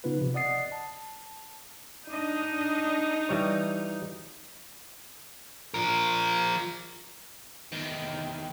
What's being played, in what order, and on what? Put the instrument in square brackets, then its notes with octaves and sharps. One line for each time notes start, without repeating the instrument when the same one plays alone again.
[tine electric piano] C#3 B3 D#4 F4 B4
C3 F3
D5 D#5 F#5 D#6 A6 C7
A5
[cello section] D4 D#5 [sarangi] D#4
[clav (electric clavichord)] E3 G3 C#5
[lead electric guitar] F3 A#4
[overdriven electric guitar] E2 D#3